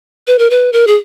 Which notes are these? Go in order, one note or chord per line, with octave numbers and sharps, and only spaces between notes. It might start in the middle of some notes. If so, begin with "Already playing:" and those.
B4
A#4
B4
A#4
G#4